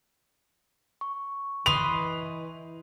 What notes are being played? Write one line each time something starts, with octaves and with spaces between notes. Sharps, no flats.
C#6
E3 B4 D#5 C6 F7